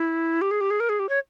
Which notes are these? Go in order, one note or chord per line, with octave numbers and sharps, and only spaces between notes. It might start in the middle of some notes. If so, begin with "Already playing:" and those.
Already playing: E4
G4
G#4
G4
G#4
A#4
G#4
G4
C#5